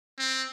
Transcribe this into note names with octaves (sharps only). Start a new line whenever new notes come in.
C4